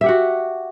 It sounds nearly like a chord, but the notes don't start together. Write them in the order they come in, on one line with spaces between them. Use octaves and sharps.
E5 G4 F#5 F#4